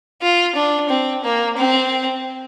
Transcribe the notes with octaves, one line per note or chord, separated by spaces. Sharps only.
F4
D4
C4
A#3
C4